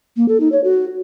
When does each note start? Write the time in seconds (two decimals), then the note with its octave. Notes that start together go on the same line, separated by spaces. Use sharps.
0.17 A#3
0.28 A4
0.40 D#4
0.52 C#5
0.64 F#4